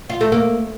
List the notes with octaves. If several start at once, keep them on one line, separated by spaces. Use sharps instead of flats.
F4
A3
A#3